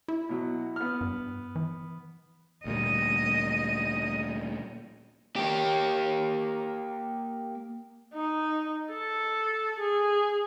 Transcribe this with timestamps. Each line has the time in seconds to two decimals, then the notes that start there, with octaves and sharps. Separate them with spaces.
0.08 E4
0.29 B2 F#3
0.76 B3 F6
1.01 G2
1.56 E3
2.65 D2 A#2 G3 D#5
5.36 A#3 G4
8.14 D#4
8.91 A4
9.80 G#4